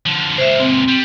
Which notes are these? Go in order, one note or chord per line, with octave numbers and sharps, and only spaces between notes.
D3 F3
C#2 A#2 C5 E5
C4
G3